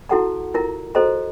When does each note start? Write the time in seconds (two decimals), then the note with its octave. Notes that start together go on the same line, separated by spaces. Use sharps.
0.09 E4 F#4 A4 F#5 A5 A#5
0.54 E4 F4 A#4 A#5
0.95 F#4 A4 C5 D#5 A#5